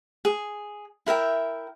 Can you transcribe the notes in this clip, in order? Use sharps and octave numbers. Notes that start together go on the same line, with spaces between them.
G#4
E4 A#4 E5 G5